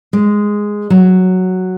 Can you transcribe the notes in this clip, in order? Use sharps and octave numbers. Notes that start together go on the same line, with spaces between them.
G#3
F#3